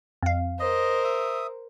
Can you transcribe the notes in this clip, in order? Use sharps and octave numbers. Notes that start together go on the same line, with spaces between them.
F2 F5
A#4 C5 D#5
E5 D#6